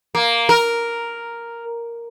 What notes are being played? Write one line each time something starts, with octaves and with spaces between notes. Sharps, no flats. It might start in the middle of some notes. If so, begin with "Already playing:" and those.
A#3
A#4